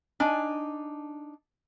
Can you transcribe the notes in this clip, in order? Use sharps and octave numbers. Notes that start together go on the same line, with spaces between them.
D4 D#4 G#5